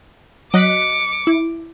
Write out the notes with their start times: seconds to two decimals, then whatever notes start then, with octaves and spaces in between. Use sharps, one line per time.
0.54 F#3 D#5 D6 F#6 B6 C#7
1.27 E4